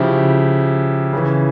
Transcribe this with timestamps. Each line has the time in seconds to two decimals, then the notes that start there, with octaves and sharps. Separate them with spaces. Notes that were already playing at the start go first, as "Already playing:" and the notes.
Already playing: C#3 F3 E4 G4
1.13 C#3 E3